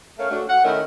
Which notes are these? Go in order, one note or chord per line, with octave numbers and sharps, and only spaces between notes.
A3 C#4 A#4 C#5 F5
A3 D4 F#4
F#5
D#3 A3 C#4 D#4 E4 A#4